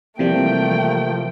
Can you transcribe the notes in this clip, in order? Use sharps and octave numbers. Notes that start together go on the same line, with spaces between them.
C3 E3 F3 G3 A3 A#3 G5